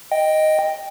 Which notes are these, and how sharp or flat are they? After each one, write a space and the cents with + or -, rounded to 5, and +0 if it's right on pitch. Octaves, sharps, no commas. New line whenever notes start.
D#5 +0 G5 +0